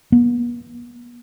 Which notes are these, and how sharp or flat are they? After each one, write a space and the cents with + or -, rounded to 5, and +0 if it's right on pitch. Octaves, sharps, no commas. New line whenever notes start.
B3 -40